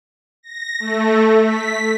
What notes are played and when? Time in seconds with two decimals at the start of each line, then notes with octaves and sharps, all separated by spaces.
0.43 A#6
0.80 A3
1.44 B6